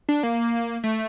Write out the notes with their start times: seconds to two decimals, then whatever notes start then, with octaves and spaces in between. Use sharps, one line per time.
0.09 D4
0.23 A#3
0.84 A3